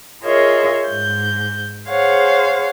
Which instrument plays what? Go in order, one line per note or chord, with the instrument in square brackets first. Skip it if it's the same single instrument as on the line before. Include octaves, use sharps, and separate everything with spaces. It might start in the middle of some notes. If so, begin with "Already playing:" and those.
[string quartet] F4 G#4 A#4 C#5 D#5 E5
G#2 G6
G#4 C5 C#5 F5 F#5